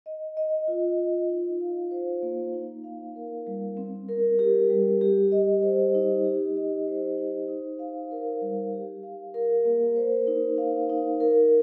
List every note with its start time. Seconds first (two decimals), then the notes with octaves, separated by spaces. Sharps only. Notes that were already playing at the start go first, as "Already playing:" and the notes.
0.06 D#5
0.37 D#5
0.68 F4
0.98 F4
1.30 D#4
1.61 F5
1.91 C5
2.22 A#3
2.54 D#4
2.84 F5
3.16 A#4
3.47 G3
3.77 C4
4.09 A#4
4.39 G4
4.70 G3
5.01 G4
5.32 D#5
5.62 C5
5.95 D#4
6.24 G4
6.56 D#5
6.87 C5
7.18 D#4
7.48 D#4
7.79 F5
8.11 A#4
8.42 G3
8.73 G4
9.03 F5
9.34 A#4
9.65 A#3
9.96 C5
10.27 D#4
10.58 F5
10.90 D#4
11.20 A#4